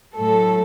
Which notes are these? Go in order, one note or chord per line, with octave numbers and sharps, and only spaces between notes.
A2 F#3 A3 A4